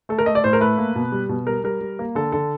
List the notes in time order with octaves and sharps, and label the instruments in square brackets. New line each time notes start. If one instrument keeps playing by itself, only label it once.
[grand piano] A3 A4
A#4
A3 D#5
D5
A2 C5
A#4
A3 B4
A#3
B2
G3
B2
G3 A#4
G3 A#4
G3
A#3
D3 A4
D3 A4